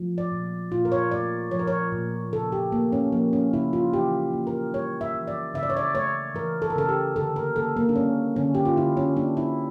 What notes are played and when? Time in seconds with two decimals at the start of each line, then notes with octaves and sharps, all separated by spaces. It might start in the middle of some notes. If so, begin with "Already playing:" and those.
Already playing: F3 A3
0.18 D5
0.32 A#2
0.71 A#2 F4
0.85 A#4
0.92 C#5
1.11 A3 D5
1.51 F3 C#5
1.59 A#4
1.67 C#5
1.92 A#2
2.32 C#3 A4
2.52 G4
2.72 A3 A#3
2.92 C#4
3.12 F3 A#3
3.33 C#4
3.53 C#3 E4
3.73 F4
3.93 E3 G4
4.33 A#3
4.47 A#4
4.74 G3 C#5
5.01 E5
5.15 E3
5.28 D5
5.54 C#3 E5
5.63 D5
5.70 C#5
5.77 D5
5.95 A3 C#5
6.35 E3 A#4
6.62 A4
6.70 A#4
6.76 C#3 A4
6.89 G4
7.16 D3 A4
7.36 A#4
7.56 A#3 A4
7.77 A#3
7.89 D4
7.96 G3 C#4
8.36 D3 C#4
8.55 G4
8.65 F4
8.77 D3 E4
8.97 C#4
9.16 A#3 D4
9.37 E4